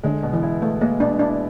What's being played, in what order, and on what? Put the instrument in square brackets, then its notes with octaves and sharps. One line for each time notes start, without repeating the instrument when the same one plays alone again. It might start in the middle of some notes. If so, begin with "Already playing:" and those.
[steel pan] D3 [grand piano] G#3
[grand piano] B2
[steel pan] E3
[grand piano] E4
[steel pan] A3 [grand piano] B3
[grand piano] G#3 [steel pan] A#3
[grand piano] B2 [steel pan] D4
[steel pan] D4 [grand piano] E4